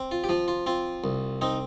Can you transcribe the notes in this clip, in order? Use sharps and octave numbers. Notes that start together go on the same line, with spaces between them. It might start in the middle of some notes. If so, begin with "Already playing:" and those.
Already playing: C4
F4
G4
F3 F4
F4
C4 F4
C2
C4 D#4